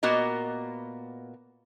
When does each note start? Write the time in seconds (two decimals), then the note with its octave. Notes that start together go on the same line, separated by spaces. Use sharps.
0.03 A#2 B3 F#4 A#4 D#5